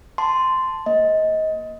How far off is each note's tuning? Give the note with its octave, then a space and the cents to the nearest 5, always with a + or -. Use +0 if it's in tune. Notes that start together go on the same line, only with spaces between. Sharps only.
A5 +0 C6 -10
A#3 +0 D#5 +20